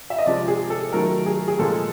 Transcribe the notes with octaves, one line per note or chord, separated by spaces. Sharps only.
E5
D#5
C3 F3 G#3 D5
G#4
A4
D#3 F#3 A3 A#4
G#4
G#4
A#2 F3 G#3 A4